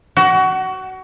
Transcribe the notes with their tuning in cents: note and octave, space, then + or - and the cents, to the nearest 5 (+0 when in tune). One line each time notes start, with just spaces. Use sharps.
F#4 +25